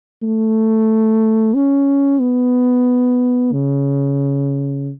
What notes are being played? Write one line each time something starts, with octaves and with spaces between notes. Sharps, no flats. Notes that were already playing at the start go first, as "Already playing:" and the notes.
A3
C#4
B3
C#3